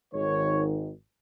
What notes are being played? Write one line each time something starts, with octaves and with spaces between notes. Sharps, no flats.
G#1 G#2 D#3 C#5